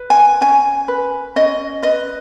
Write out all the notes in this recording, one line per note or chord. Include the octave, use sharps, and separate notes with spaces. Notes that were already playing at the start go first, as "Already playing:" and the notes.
Already playing: B4
G#5
C#4 G#5
B4
C#4 D#5
B4 D#5